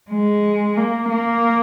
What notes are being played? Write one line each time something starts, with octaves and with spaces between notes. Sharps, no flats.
G#3
A#3
A#3